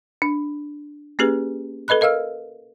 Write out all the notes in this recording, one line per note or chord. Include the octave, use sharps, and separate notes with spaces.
D4
A#3 C#4 G4 G#4 B4
A4 B4 D#5 B5 F#6
A#4 D#5 F5 E6 F6